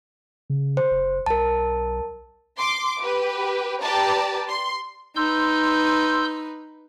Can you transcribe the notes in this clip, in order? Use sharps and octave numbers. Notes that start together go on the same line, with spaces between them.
C#3
C5
F#1
B1 A#4 A5
C6 D6
G4 B4
G4 B4 D5 A5 A#5
C6
D#4 B4 C6 E6 G6